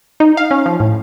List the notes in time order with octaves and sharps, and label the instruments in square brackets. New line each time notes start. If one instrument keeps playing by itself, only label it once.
[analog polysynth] D#4
F5
C#4
F3
A2